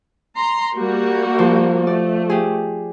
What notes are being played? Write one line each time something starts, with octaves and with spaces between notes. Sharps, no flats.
A#5 C6
G3 A#3 F#4
F3
A3 D5
G4 G#4